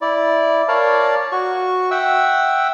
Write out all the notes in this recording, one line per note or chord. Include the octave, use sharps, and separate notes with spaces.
E4 D5
A#4 C#5 D5 F5 A5
F#4 C#6
E5 F#5 G5 E6